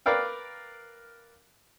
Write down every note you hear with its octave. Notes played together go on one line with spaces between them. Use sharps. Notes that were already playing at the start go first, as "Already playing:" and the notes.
A#4 B4 D5 F5 G5